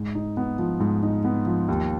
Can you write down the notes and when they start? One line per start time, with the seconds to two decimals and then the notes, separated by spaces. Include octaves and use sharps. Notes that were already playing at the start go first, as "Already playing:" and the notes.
Already playing: G#2
0.15 D#4
0.37 B3
0.58 F3
0.80 G#2
1.03 D#4
1.25 B3
1.46 F3
1.68 D#2